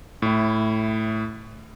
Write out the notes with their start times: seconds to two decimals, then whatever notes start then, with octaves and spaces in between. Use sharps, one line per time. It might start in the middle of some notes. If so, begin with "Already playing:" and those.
0.22 A2 E4